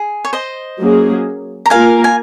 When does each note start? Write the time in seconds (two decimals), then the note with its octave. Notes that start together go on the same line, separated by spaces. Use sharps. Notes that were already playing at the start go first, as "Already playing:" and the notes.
Already playing: G#4
0.25 C#5
0.33 C5 D#5
0.79 F#3 A#3 C#4 G#4
1.66 A#5
1.70 A#3 F4 A#4 F5 G#5
2.04 G#5